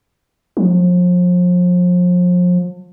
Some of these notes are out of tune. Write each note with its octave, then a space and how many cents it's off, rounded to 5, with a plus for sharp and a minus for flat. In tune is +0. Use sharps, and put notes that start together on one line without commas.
F3 +35